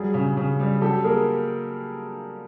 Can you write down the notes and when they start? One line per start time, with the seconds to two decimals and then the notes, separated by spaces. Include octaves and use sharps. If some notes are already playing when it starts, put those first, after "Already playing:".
Already playing: F#3 G3 G#4
0.14 C#3
0.37 C#3
0.60 G3
0.81 F#3 G4 A4
1.04 A#3 G#4 A#4